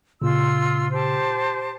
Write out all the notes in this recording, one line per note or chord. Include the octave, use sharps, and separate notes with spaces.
A#2 C#3 F4 C6 E6
G4 C5 A5